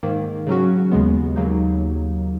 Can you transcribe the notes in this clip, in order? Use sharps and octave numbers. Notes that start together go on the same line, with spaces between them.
G#2 D#3 A#3
C#3 F#3 C#4 F#4
D#2 C#3 G#3 B3
D#2 C#3 F#3 A#3 D#4